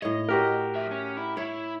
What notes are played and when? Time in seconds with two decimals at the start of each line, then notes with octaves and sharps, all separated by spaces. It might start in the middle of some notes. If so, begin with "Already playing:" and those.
0.02 A2 C#5 D#5
0.29 F#4 G4 A#4
0.76 F2 E5
0.91 C#4
1.17 E4
1.37 E4 C#5 E5